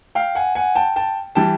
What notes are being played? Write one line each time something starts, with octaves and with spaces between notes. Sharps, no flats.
F5 G5
F#5 G#5
F#5 G#5
G5 A5
G5 A5
E3 G3 G5 A5